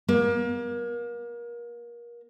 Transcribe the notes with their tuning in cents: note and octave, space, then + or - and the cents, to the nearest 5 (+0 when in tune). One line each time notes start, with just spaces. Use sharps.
A#3 +30